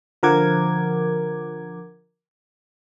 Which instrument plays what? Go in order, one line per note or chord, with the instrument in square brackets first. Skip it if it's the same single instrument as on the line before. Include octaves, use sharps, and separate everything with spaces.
[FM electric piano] D3 F3 A#4 F#5 D6 G#6